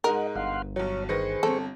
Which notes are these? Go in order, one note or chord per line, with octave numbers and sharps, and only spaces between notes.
G#2 G#3 D#4 A#4 D#5 F#5
G1 F5 F#5 C6
B1 F#3 C#5
D#3 G#4 B4 C5 C#6 A#6
G1 C4 A4